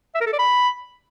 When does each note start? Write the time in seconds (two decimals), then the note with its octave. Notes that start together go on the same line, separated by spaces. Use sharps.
0.15 E5
0.21 A#4
0.27 A4
0.33 D5
0.39 B5